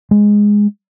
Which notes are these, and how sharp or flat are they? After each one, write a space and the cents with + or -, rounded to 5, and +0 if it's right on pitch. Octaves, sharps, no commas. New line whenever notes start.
G#3 -5